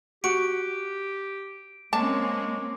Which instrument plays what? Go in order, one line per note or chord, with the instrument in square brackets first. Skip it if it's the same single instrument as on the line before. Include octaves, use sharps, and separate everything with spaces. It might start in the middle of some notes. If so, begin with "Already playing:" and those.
[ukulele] F#4 [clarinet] G4 [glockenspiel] D7
[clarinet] G#3 [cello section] A#3 C4 C#4 [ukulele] A5 [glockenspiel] D6